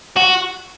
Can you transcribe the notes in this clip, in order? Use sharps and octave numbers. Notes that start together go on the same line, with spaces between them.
F#4